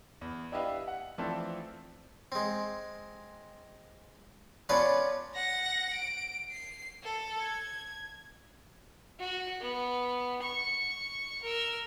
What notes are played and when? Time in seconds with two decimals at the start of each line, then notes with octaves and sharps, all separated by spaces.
0.21 E2
0.52 D4 E4 G4 B4 D#5 F5
0.88 F#5
1.18 E3 F3 A3 C4 D4 A4
2.32 G#3 C4
4.69 B3 C#4 D4 F4 B4 D5
5.35 F#5 A#6
5.94 D7
6.51 C7
7.04 A4
7.42 G#6
9.19 F#4
9.61 B3
10.42 C#6
11.42 A#4 E6